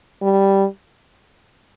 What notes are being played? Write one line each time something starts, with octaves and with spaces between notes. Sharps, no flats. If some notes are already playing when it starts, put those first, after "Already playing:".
G3